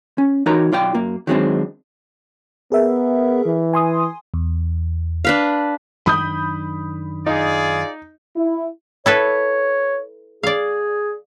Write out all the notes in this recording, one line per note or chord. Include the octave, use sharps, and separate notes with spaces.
C#4
E3 D#4 F#4 A#4 C#5 A#5
B1 F4 D5 G5
F#2 A#3
D#3 F#3 G#3 A3 C4 D4
B3 G#4 A#4 E5
E3
G#5 C6 D#6
E2
D4 B4 F5
F#2 D#3 D4 B5 D#6 G6
D#4 F4 G#4 D5
E4
E4 A4 B4 C#5
G#4 D5 F5